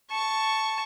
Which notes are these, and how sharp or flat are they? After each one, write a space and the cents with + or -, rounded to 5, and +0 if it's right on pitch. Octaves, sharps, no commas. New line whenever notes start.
A5 +0 C#6 +0